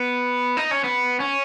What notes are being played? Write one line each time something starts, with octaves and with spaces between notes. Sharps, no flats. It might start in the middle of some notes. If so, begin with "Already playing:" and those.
Already playing: B3
D#4
C#4
B3
C#4